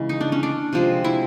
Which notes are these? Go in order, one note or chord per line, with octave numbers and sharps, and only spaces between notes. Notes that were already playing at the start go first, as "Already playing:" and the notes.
Already playing: C#3 E3 G#3
D#4
D4
C#4
D4
C3 F3 G#3
E4